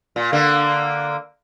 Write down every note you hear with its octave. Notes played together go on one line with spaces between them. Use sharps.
A#2
D3 A#3